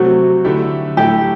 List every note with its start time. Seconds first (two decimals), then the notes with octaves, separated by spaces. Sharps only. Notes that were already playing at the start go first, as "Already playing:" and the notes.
Already playing: C3 F#3 A3 C4 F#4
0.44 D3 A3 E4 G4
0.97 A2 F#3 A3 E4 G4